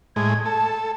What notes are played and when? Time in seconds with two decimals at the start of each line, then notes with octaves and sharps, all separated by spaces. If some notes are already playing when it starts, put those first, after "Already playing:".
0.16 A2 G#3 G#6
0.46 A4 A5